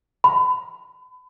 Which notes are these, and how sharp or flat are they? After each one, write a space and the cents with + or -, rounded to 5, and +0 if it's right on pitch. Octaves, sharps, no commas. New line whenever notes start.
B5 +35